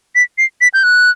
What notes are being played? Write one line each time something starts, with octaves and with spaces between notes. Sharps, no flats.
B6
C7
B6
G6
F#6